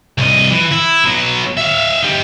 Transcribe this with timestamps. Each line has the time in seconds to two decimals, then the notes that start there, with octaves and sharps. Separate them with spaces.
0.18 C2 D#5
0.51 E3
0.72 E4
1.05 F#3 B3
1.57 E5 F5
2.02 D#4 G4